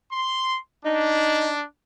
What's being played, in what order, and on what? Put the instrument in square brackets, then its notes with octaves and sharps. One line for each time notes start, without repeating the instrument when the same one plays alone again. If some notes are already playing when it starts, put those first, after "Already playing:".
[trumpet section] C6
[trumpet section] D4 [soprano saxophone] D#4